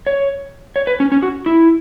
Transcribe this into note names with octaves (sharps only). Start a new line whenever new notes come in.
C#5
C#5
B4
C#4
C#4
F#4
E4